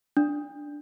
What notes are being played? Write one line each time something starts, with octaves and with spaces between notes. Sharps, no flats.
D4